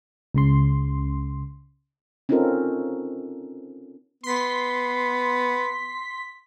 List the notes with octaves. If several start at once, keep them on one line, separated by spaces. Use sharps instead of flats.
C#2 C#3 C6
C4 C#4 D#4 F4 A4 A#4
B3 C6 B6